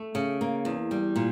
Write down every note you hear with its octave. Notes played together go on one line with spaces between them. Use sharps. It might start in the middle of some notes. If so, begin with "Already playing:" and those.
Already playing: A3
C#3
A#3
E2
G3
A#2